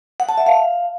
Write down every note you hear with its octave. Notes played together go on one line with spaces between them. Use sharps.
F#5
A5
E5
F5